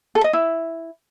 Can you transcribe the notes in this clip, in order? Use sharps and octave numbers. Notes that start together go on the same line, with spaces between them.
A4
D#5
E4